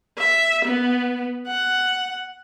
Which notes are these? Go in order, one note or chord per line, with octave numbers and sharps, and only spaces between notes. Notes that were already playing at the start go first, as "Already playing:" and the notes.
E5
B3
F#5